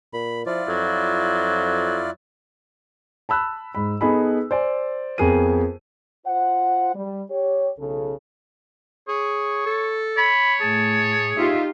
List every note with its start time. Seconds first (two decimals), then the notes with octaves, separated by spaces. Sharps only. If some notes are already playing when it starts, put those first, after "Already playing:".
0.13 A#2 B5
0.46 F3 E4 F4 D5
0.68 F2 F#3
3.29 A5 B5 E6 F#6
3.75 G#2 B5
4.01 B3 D#4 G#4 A4 B5
4.51 C5 D5 G#5
5.18 F2 B3 G#4 A#4 D#7
6.25 F4 C5 F#5
6.94 G3
7.30 G4 C#5
7.78 B1 C#3 A4
9.08 G#4 C#5
9.66 A4
10.18 C#5 B5
10.61 A2 G#4 A5
11.37 D#4 F4 G4 E5